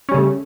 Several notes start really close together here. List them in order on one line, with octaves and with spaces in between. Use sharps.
C#4 G3 C#3 A3